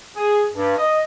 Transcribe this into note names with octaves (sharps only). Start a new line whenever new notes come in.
G#4
G2
D#5